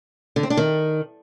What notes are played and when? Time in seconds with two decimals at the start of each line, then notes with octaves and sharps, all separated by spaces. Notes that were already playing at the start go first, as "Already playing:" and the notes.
0.36 D3
0.43 C4
0.50 D4
0.57 D#3